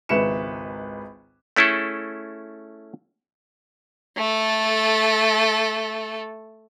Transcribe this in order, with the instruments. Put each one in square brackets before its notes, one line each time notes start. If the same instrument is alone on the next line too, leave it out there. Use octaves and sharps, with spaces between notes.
[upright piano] G#1 C#2 B4 E5 C#7 E7
[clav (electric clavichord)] A3 C#4 E4 G#4 A4
[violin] A3 A4